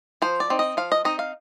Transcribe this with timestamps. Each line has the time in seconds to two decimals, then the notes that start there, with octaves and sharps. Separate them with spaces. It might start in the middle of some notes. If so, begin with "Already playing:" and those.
0.22 F3 C5
0.40 D5
0.50 C4 D#4
0.59 D#5
0.77 F3 F5
0.92 D#5
1.05 C4 D#4 D#5
1.19 F5